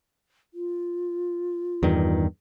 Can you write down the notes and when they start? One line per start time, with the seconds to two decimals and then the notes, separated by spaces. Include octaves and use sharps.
0.54 F4
1.83 E2 G2 D#3